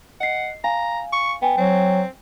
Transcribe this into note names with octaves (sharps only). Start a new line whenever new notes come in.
D#5 F#5 C7
F5 G#5 A#5
C#6
B3 G5 G#5
F#3 C4